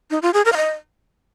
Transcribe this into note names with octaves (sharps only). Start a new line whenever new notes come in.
D#4
F4
G#4
A#4
F5
D#5